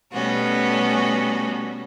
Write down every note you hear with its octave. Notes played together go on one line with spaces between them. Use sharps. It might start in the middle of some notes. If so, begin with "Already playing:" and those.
B2 G3 A3 B3 C#4 F#4